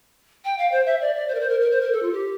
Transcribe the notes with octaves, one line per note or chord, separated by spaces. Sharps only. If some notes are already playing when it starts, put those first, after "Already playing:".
G5
F5
C5
E5
D5
D5
C5
A#4
C5
A#4
A#4
C5
A#4
A4
F4
G4